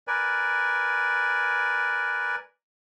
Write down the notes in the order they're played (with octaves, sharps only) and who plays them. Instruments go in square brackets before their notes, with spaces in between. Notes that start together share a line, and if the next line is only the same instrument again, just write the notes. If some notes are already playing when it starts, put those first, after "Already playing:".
[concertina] A#4 B4 D5 G#5